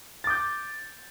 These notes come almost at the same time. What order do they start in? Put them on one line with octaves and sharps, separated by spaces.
A6 D6 G6